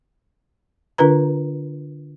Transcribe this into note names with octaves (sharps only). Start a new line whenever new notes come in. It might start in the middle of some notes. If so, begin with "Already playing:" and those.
D3 D4 F4 A#4 B4 A#5